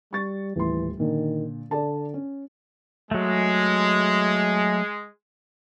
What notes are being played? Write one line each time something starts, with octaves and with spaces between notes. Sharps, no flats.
G3 C#6 A6
D#1 A2 E3 C6
A#2 D3 D#3
D3 A4 D5 A5
C#4
F#3 G#3 A3